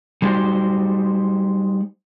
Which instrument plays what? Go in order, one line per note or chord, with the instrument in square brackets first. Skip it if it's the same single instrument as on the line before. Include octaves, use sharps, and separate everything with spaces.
[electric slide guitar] G3 G#3 D#4 F#4 C5